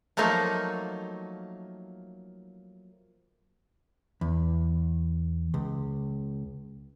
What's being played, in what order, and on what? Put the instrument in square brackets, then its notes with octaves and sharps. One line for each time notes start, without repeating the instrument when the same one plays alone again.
[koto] F3 F#3 A3 A#3 D#4
[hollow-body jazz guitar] E2
C#2